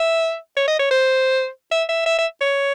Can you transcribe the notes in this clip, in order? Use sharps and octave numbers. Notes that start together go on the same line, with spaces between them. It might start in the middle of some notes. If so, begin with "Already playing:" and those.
Already playing: E5
C#5
D#5
C#5
C5
E5
E5
E5
E5
C#5